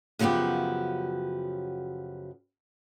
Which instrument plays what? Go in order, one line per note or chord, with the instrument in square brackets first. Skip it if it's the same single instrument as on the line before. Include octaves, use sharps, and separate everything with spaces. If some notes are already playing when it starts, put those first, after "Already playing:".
[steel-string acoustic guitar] F#2 C#3 F3 B3 F#4 G4